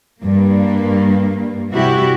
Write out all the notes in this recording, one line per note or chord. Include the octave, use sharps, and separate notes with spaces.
G2 A#3
C3 G3 E4 F#4 G4